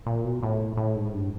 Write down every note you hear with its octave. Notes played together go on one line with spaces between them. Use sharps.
A#2
B2
A2
A2
G#2
G2